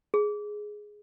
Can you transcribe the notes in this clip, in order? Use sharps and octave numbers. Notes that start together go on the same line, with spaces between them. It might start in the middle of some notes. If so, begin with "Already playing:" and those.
G#4